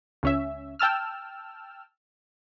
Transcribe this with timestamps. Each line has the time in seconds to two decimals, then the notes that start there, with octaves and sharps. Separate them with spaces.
0.23 C#2 C#4 E5
0.79 G5 A5 E6 F6